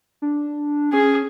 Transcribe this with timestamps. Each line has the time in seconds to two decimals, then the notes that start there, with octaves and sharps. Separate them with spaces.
0.22 D4
0.93 C#4 G#4